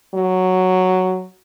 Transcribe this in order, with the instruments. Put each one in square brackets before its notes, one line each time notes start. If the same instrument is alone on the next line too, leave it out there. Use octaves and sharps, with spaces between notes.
[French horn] F#3